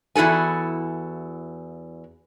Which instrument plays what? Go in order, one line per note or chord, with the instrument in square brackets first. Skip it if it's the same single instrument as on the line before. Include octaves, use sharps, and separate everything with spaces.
[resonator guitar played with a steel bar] E2 E4 F#4 A4 G#5